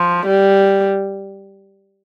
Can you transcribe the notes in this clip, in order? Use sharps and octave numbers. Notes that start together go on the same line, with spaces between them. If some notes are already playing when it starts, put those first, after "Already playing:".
Already playing: F3
G3